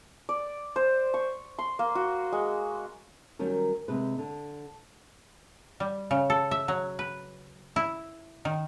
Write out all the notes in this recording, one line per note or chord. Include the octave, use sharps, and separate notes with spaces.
D5
C5
C#6
C6
A#3
F#4
G#3
D#3 F#3 G3 C#4 A#4
D#2 C3 G#3 B4
D3
G3
C#3
A4
E5
F#3
B4
E4
D#3